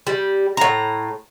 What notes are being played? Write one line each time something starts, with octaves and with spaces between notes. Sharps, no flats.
G3
A2 A#5